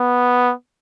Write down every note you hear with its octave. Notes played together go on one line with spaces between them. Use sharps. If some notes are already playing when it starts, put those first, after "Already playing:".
Already playing: B3